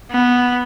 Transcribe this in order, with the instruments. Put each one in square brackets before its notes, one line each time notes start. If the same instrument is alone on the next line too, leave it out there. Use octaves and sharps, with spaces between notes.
[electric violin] B3